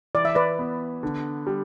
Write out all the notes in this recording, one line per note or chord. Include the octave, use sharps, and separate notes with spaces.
E3 D5
E5
B4 D5
B3
D3
G3